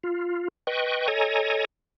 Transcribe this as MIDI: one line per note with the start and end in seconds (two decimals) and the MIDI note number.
0.03 0.48 65
0.67 1.07 71
0.67 1.07 75
0.67 1.07 79
0.67 1.07 85
1.08 1.65 69
1.08 1.65 73
1.08 1.65 75
1.08 1.65 80
1.08 1.65 82